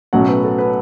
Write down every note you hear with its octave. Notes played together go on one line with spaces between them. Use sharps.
B1 A2 F#3 C#4 F#5
B4
A4
B4